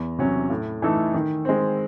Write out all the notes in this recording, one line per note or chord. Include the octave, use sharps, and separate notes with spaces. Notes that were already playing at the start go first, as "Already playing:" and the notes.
Already playing: E2
C3 F#3 C#4
A2
E3 A3 D#4 A4
D#3
G#3 C4